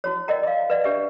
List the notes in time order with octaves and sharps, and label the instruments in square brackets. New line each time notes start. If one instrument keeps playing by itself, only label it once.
[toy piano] E4 F#4 C#5
A#4 D5 D#5 F#5 G5 A#5
D#5 F5
B4 D5 F#5
D4 G4 B4 E5